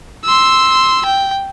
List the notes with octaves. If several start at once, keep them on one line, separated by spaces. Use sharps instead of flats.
C6 E6
G5